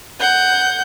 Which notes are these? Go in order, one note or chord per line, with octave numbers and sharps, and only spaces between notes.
F#5 G6